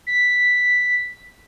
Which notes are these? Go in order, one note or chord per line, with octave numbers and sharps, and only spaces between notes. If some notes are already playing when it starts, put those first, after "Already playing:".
B6